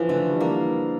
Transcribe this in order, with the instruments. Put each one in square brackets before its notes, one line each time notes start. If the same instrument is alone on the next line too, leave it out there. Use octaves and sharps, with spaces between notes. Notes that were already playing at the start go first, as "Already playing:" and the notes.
Already playing: [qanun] E3 D4 [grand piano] F3
[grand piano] D3 [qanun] A3
[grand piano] G3
[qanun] A#3